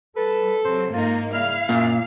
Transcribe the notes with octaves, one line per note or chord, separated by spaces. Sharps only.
G3 A4 B4
C3 F#3 C5
G#2 A#3 D#4 F4
C#3 G3 E4 F5 F6
F#2 A#2